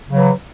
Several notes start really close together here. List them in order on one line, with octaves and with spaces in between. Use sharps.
C#3 F#3 E3